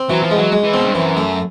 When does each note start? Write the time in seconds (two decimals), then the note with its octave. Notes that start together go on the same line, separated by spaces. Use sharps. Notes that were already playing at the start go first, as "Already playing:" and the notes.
Already playing: C4
0.10 E3 F#3
0.23 F3
0.31 G#3
0.38 F#3
0.52 G#3
0.63 E3
0.74 B2 C4
0.84 G2
0.95 F#2 E3
1.17 A3